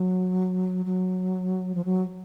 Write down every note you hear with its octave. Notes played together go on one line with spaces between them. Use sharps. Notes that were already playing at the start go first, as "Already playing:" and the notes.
Already playing: F#3
F#3
F3
F#3